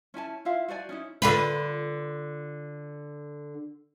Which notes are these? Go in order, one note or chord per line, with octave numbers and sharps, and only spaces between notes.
C#4 E4 G#5 A5
E4 F4 E5 F5
F#4 C5 D5 G#5
C#4 D#4 E4
D3 F4 B4